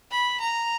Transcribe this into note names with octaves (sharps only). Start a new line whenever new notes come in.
B5
A#5